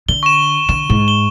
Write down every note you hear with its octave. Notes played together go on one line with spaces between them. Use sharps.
D3 G7
C#6 E7
D3 E7
G#2
G7